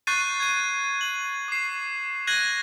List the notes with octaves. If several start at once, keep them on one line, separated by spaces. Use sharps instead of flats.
C#6 F#6 G6 A6 C7 D#7
G#6 D#7
F#7
D6 C7
F#6 G#6 A#6 D#7 F#7